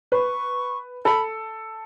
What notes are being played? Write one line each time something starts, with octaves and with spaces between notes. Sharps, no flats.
B4 C#6
A4 B5